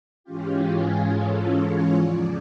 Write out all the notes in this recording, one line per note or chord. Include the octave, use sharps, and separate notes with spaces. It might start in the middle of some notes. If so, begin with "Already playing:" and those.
G#2 E3 G#3 C#4 F4 G4
G#4
A4
C#5
E2 C#3 F3 D5